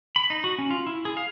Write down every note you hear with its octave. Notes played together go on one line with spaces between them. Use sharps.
B5
D#4
F#4
C#4
F4
E4
G#4
F5